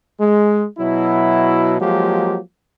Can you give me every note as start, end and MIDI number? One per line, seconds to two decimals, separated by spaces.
0.20 0.66 56
0.78 1.76 47
0.78 1.76 54
0.78 1.76 64
1.81 2.38 53
1.81 2.38 54
1.81 2.38 56
1.81 2.38 58
1.81 2.38 67